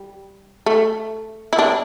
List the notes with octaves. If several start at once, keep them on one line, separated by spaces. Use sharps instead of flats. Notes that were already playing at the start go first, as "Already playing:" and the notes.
Already playing: G3
A3
E4
D4